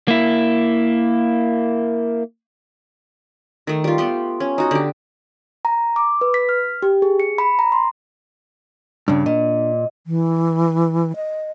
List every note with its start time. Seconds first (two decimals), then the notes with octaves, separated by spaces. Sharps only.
0.08 A#3 E4
3.67 D#3 A3
3.84 G3 F4
3.98 A3 B3 G4 C6
4.40 C#4
4.58 D#4 F#4
4.71 D3 G4
5.65 A#5
5.96 D6
6.21 B4
6.34 B6
6.49 F6
6.82 G4
7.02 G#4
7.20 C#7
7.38 B5
7.59 A#5
7.72 C6
9.08 G2 C#3 D4
9.26 A#2 D#5
10.07 E3
11.16 D#5